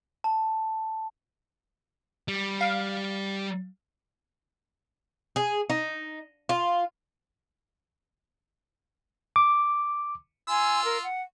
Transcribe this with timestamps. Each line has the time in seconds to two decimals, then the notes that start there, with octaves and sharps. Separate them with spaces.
0.24 A5
2.28 G3
2.61 F5
5.36 G#4
5.70 D#4
6.49 F4
9.36 D6
10.48 F4 G#5 C6 E6
10.85 A#4
11.03 F#5